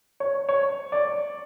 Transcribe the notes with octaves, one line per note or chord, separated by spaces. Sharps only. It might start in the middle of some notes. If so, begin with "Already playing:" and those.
C#5
C#5
D5